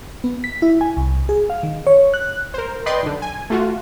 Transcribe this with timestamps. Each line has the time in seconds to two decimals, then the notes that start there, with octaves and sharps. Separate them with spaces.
0.24 B3
0.44 B6
0.62 E4
0.81 G#5
0.97 C2
1.29 G#4
1.50 F5
1.63 D#3
1.87 C#5
2.14 F#6
2.54 A#4 C5
2.86 B4 D5 D#5 G5 C6
3.03 B1 D3
3.22 G#5
3.50 A3 F4 F#4